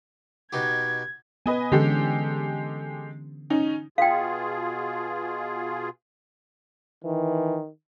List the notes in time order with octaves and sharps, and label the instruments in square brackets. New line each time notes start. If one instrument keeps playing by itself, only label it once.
[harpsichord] B2 D#4 G4 [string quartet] G#6
[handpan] B3 [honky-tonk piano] B4 D#5 G#5
[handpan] D3 E3 C#4 [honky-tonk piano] G#3 G4 A4
[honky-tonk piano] C#4 D#4
[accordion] B2 F4 G#4 [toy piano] F5 G5
[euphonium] D#3 [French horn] E3